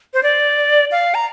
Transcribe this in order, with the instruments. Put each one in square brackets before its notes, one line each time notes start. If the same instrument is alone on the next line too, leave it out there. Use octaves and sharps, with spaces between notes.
[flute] C5
D5
F5
A#5